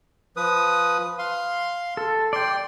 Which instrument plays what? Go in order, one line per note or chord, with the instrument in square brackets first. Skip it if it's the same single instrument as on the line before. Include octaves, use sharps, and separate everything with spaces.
[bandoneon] F3 B4 D#6
F5 C6
[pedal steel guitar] A4
[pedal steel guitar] D5 G5 [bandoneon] C6